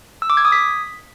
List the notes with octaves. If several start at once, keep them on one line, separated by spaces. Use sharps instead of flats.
E6
D6
G#6
D#6
B6